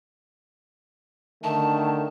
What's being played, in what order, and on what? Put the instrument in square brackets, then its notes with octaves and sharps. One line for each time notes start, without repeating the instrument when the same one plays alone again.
[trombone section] D3 D#3 A3 [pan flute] A5